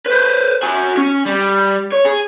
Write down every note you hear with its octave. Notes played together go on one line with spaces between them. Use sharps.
B4 C5
F#4 G#5
C#4
G3
C#5
G#4